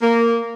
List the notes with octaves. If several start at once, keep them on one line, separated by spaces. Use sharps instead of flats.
A#3